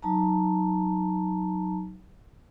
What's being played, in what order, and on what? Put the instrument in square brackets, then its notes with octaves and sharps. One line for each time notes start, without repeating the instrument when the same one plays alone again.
[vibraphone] F#3 D#4 A5 A#5